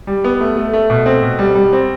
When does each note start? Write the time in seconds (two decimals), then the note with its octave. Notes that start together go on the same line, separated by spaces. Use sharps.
0.07 G3
0.24 B3
0.40 A3
0.57 A3
0.73 A3
0.90 B2
1.06 C4
1.23 B2
1.39 G3
1.55 G3
1.73 C4